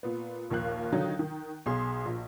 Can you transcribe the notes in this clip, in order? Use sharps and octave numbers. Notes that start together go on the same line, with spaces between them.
A#2 B3
A#1 D#2 F3 F5 F#6
D3 D#3 F#3 D#4 F4
D#3
B1 G#4 C6
A#1